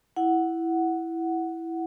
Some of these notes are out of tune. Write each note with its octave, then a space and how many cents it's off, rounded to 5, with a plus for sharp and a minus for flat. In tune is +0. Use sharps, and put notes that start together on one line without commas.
E4 +0 F#5 +0